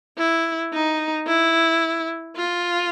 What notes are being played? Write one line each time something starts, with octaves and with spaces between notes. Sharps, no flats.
E4
D#4
E4
F4